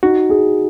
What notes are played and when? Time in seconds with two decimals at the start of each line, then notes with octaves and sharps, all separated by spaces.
0.03 D#4 F#4
0.30 G#4